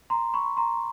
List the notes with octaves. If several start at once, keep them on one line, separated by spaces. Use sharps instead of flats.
A#5 C6
B5 C#6
A#5 C6